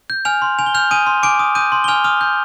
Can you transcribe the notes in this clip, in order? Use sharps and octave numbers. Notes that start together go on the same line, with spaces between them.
G6
G#5 F6 F7
C6
G#5 F7
G7
F6 G6 F7
G#5 D#6 D#7
C6
G#5 D6 D7
D#6
D#6 G6 D#7
C6
G7
G#5 F6 F7
D#6 F6 F7
G6